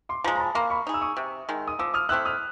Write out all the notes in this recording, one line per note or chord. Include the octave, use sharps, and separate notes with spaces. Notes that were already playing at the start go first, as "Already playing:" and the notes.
C6 D6
F3 G#3 A#5 C6
A#5
A5 B5
A#3 A#5 C6
B5 C#6
D#4 G#4
E6
C#6 D#6
C3
D#3 G#3
D#6
F3 D6 E6
D#6 F6
A3 C4 E4 E6 F#6
D#6 F6